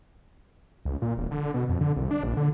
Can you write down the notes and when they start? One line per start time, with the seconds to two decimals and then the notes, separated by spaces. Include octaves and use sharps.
0.85 C#2
1.02 A#2
1.17 E1
1.31 D3
1.54 B2
1.69 F2
1.81 D3
1.96 C2
2.11 D4
2.23 A#1
2.37 D3